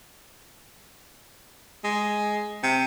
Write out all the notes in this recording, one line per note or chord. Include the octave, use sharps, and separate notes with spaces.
G#3
C3